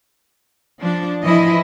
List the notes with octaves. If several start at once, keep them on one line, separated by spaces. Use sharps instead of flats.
F3 D4
E3 F3 E4 D#5